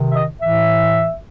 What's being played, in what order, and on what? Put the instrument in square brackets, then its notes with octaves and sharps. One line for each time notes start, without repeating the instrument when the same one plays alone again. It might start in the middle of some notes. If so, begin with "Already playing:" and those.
Already playing: [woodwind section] C3 D#3
E5
D#5
A2 E3 E5